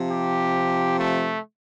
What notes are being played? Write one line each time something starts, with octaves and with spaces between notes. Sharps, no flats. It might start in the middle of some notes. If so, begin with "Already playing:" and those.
Already playing: C3 F3
G4
A3